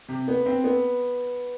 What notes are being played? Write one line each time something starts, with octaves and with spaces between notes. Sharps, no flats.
C3
B3
C4
B3